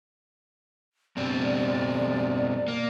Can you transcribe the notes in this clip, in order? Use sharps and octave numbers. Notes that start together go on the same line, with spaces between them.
F#2 B2 C4 D5
A#3